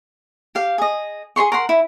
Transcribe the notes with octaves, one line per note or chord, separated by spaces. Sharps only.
G4 F5
G#4 D#5
G#4 C#5 C6 C#6
A#4 F#5 C6
E4